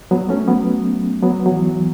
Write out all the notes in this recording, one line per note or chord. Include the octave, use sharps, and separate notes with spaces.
F#3 B3
A3 C#4
F#3 B3
F#3 B3
F#3
E3